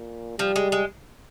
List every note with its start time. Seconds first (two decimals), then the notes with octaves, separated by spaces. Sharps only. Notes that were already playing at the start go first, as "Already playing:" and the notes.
Already playing: A#2
0.39 F3 G3
0.56 G#3
0.72 G#3